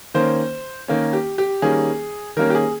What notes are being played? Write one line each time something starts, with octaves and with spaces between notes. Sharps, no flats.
D#3 A#3 C#4 C5
D#3 A#3 C#4
G4
G4
D#3 G3 A#3 C#4 G#4
D#3 G3 A#3 C#4 A#4
G4
G#4